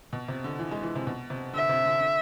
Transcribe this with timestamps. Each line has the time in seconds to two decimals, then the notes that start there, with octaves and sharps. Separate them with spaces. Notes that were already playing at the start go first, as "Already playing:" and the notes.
0.13 B2
0.28 C3
0.44 D3
0.59 E3
0.71 G#3
0.83 E3
0.95 C3
1.07 B2
1.30 C3
1.53 D3 E5
1.69 C3
1.85 D3
2.01 D3